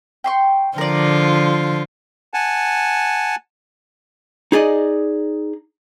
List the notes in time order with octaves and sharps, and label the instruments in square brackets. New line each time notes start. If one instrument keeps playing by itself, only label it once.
[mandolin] G5 C6 C#6
[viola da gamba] D3 F3 F4 [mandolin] A#4 D5
[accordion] F#5 G#5 A5
[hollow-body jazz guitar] D#4 G#4 D5 D#5